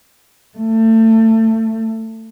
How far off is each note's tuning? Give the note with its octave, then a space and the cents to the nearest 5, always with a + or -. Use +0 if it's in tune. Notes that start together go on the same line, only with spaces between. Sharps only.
A3 +25